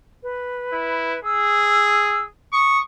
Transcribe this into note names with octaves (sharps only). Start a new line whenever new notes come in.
B4
E4
G#4 E6
C#6 D#6